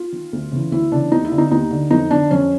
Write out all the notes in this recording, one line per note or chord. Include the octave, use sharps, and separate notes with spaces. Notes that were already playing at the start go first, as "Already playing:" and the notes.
Already playing: F4
D#3
D2
C#3 E3
D2 E4
C#3 E3 D4
D#2 D#4
E4
D3
D#4
D#2 D#4
D3
F2 D#4
D3 D4
F2 C#4